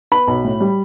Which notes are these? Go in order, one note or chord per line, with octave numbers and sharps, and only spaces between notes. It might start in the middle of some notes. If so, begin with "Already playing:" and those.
B3 B5
B1
A2
G3